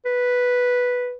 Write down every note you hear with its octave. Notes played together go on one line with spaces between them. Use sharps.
B4